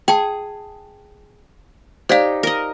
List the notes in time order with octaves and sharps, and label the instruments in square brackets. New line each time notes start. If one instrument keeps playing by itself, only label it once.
[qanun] G#4 [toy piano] G5 A5
[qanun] D#4 G4 [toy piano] C5 D5 F5
[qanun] A#4 D#5